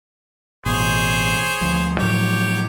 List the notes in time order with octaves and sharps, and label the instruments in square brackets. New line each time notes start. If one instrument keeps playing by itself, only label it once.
[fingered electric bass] A1 B2 [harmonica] G#4 C5 C#5
[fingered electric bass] D2 F3
[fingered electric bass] A2 F3 F#3 [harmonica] G4 C#5